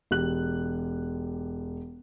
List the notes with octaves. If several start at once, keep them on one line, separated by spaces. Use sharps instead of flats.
E1 G4 F#6 F#7